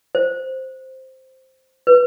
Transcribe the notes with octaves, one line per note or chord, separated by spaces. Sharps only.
C5
B4